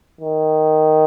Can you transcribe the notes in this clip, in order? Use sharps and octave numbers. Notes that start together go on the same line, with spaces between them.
D#3